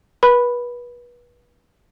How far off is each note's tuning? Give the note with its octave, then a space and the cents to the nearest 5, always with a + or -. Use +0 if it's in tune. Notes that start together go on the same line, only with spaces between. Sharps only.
B4 -30 B5 +0